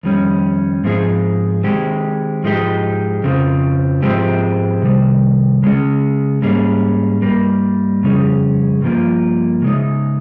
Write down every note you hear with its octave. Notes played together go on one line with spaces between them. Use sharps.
F2 D#3 G3 C#4
G#2 F3 C4 D#4 G#4
D#3 G#3 C4 G4
G#2 F3 G#3 D#4 G4
F2 C#3 F3 C4
G#2 F3 G#3 C4 G4
C3 D#3 G3
C#3 G#3 C#4 G#4
G#2 G3 A#3 C#4 G#4
G2 G3 A#3
F2 C#3 G3 C#4 G#4
G2 F3 A#3 F4
C#3 G#3 D#4